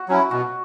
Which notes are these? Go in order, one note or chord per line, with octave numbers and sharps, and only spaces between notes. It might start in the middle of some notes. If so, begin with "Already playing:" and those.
Already playing: F#4
F#3 C#4 E4
B2 F#4